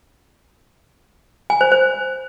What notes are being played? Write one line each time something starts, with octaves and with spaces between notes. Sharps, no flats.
G#5
C5
C5